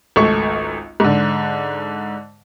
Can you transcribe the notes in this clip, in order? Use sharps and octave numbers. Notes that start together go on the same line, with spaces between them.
G#1 C#2 A3 C#6
G#2 D3